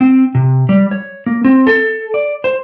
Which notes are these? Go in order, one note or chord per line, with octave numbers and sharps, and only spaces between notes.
C4
C3
G3
C#5
A#3
C4
A4
D5
C5